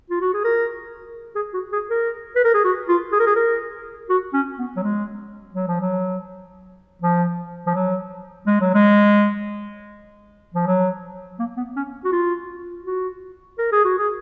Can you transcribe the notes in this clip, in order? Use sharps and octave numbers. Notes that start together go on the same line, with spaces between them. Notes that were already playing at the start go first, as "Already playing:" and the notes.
F4
F#4
G#4
A#4
G#4
F#4
G#4
A#4
B4
A#4
G#4
F#4
F4
G#4
A#4
G#4
A#4
F#4
C#4
B3
F#3
G#3
F#3
F3
F#3
F3
F3
F#3
G#3
F#3
G#3
F3
F#3
A#3
B3
C#4
F#4
F4
F#4
A#4
G#4
F#4
G#4